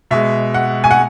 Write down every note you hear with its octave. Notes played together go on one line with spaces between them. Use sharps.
B2 G#3 E5
F#5
G#5
F#5